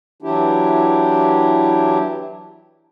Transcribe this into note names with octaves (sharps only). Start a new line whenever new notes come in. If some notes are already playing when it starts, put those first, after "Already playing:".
E3 F#3 D4 E4 G4